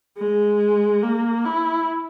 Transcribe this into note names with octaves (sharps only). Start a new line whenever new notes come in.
G#3
A#3
E4